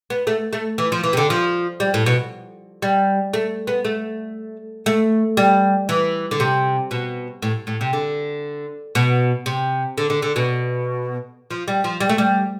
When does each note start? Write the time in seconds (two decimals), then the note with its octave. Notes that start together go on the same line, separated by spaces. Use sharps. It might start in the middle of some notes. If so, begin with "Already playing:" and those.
0.10 B3
0.27 A3
0.53 A3
0.78 E3
0.92 F3
1.04 E3
1.13 C3
1.17 D3
1.30 F3
1.80 G3
1.94 A2
2.06 B2
2.82 G3
3.33 A3
3.67 B3
3.85 A3
4.86 A3
5.37 G3
5.89 E3
6.31 D3
6.40 C3
6.91 B2
7.42 A2
7.67 A2
7.81 C3
7.93 D3
8.95 B2
9.46 C3
9.98 D3
10.10 D3
10.22 D3
10.36 B2
11.51 F3
11.68 G3
11.84 F3
12.00 G3
12.09 A3
12.18 G3